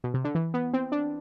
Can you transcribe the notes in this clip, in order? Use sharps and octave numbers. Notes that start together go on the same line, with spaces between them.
B2
C3
D3
E3
B3
C4
D4